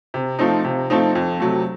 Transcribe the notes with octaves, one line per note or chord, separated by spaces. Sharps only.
C3
F3 A3 C4 D#4
C3
F3 A3 C4 D#4
F2
C3 F#3 A3